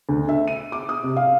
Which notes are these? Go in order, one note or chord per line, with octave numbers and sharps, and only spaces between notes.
D2
E5
D#7
D6
D#6
C3
F5